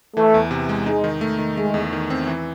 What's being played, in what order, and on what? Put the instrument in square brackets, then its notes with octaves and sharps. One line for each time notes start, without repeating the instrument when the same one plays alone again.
[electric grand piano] E3 [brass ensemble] A3
[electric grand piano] E2
C3
G#3
[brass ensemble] G#3 [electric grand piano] D#4
[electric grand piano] D#3
A3
D#3
[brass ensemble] G#3 [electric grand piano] A3
[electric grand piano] E2
D#3
C4
E3